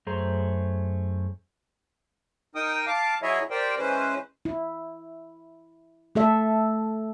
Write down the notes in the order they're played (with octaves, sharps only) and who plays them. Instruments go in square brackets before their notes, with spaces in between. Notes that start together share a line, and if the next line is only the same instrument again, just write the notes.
[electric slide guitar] F#2 A3 G#4 C5 A#5
[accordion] D#4 A#4 G5 D#6
F5 A5 D6
F#3 E4 G#4 C#5 D#5 E5
G4 A#4 C5 D5 G5
E3 G#3 C#4 B4 C5
[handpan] E4
A3 A4 E5